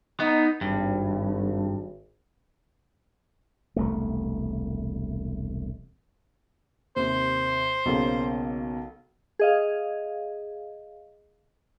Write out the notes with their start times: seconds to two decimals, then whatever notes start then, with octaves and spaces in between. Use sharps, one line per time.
0.20 B3 D#4
0.61 G#1 G2
3.76 E1 C2 A3
6.96 D#2 C3 C5
7.86 B1 C#3 A#3
9.39 G#4 D#5 F5